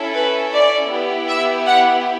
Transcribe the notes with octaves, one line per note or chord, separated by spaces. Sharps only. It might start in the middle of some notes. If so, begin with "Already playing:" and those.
Already playing: C#4 E4 A4
B4
D5
B3 E4 G4
E5
F#5